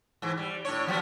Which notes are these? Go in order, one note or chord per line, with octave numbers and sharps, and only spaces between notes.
G#2 E3
G3
A2 D4 C#5
F3 F#3 B3